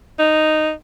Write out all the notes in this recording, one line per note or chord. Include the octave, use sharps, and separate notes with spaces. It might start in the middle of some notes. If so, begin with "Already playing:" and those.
D#4